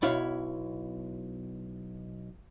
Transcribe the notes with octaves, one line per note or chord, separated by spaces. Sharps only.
B1 B2 E4 C#5 F5